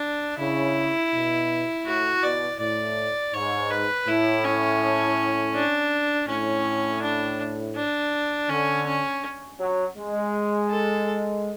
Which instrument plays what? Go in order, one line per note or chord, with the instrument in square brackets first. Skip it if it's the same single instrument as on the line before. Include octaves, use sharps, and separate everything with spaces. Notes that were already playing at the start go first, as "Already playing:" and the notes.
Already playing: [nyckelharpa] D4
[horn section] C#3 [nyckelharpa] E4
[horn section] B2
[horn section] A2 [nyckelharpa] F#4
[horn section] B2 [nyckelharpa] D5
[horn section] A2 [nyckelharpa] D5
[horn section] G#2 [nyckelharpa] C#5
[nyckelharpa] B4
[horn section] A2 [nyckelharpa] E4
[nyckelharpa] C#4
D4
[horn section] A2 [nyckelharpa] C#4
[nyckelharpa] D4
D4
[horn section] D3 [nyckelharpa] C#4
[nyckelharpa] C#4
[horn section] F#3
G#3
[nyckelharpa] A4